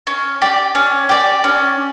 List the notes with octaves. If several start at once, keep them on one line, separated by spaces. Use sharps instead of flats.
C#4
G4 D5
C#4
G4 D5
C#4